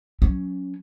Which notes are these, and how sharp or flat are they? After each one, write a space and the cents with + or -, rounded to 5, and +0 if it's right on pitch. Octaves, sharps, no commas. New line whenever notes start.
F#3 -15 C#4 +5